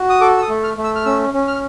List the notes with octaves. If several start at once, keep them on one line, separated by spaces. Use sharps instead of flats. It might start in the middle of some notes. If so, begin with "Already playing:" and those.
Already playing: F#4
D#6
A4 D6
E6
D#6
A3
F6
A3
E6
F6
C#4 E6
C#4
F6